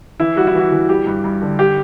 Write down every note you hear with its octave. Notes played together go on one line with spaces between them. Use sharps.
E3 E4
G3 F#4
E4
E3 F#4
E3
G3 G4
G2
G2
D3
G4